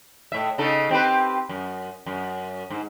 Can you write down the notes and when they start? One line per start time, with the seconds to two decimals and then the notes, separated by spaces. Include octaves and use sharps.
0.32 A2 E5
0.58 C#3 D#4 A4
0.90 C4 G4 B4
1.49 F#2
2.06 F#2
2.70 G#2